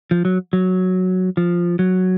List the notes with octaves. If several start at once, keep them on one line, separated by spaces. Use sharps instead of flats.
F3
F#3
F#3
F3
F#3